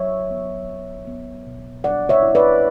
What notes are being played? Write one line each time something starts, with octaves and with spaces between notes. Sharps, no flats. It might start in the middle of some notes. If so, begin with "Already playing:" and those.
Already playing: F#3 C#5 E5
B3
F#3
B3
B2
G3 D5 F#5
C#5 E5
E4
B4 D5